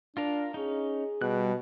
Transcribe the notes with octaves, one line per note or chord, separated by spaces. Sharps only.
D4 F4 A#4 F5
C#4 D#4 G#4
B2 G3 F#6